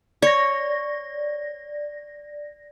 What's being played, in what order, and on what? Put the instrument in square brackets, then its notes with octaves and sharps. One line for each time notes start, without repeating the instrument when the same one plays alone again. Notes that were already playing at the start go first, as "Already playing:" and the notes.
[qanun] C#5 [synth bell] D5 A#6